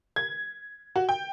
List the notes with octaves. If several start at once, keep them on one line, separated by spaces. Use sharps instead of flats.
G#6
F#4
G5